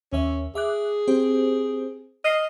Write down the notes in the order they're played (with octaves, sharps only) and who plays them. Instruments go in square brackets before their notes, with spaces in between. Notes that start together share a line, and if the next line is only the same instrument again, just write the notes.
[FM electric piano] D#2 E5 [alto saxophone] C#4
[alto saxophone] G#4 [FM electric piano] E5 D6 F#6
[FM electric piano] C4 G4 C5
[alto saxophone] D#5 [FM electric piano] F6 C7